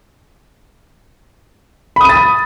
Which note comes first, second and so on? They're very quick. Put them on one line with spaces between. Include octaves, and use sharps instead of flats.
B5 D#6 D#7 A6